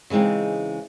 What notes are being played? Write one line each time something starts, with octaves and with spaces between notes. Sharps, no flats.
C#3 E3 G#3 C4 D#4